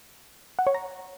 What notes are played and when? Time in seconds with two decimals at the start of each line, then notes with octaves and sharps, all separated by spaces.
0.59 F#5
0.67 C#5
0.75 A#5